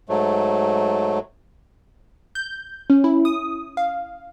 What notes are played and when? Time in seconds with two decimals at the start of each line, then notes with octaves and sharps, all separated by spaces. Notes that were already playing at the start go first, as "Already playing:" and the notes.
0.09 G#2 F#3 A3
2.35 G6
2.90 C#4
3.04 E4
3.25 D#6
3.77 F5